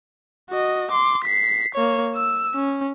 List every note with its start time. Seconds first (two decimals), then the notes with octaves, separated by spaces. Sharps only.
0.50 F#4 D#5
0.91 C6 D6
1.24 B6 C7
1.74 A#3 C#5
2.15 E6
2.55 C#4